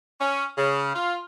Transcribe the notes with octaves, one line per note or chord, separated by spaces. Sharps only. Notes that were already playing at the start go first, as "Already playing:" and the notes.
C#4
C#3
F4